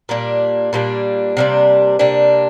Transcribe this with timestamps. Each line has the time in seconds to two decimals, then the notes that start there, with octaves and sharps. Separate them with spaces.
0.09 A#2 G3 A#3 D4
0.73 A#2 G3 A#3 D4
1.37 C3 G3 A#3 D4
1.99 C3 G3 A#3 D4